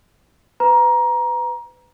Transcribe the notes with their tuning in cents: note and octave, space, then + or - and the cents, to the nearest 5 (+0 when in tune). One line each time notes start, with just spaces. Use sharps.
B4 +30 A#5 +20